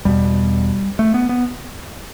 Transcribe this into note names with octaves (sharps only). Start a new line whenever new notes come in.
E2 B2 G3
A3
B3
B3